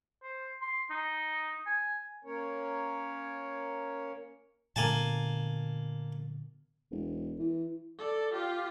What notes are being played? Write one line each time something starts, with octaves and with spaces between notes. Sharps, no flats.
C5
C6
D#4
G#5
A#3 C#4 A#4 C#5
A#2 D3 A#3 B3 G#5 A5
E1
E3
A4 D5
F4 G4